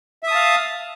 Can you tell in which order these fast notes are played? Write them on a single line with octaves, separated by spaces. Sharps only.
E5 D#6 A5 F5